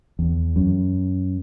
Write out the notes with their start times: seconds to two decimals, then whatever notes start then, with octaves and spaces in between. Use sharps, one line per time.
0.19 E2
0.56 F#2